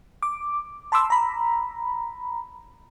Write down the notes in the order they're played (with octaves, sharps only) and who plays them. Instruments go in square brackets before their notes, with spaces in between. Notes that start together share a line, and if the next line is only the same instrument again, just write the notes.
[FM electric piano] D6
A5 B5 C6 D6 E6
A#5 B5